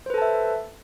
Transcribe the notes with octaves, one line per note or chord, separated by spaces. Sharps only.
A4 B4 C5 E5 A5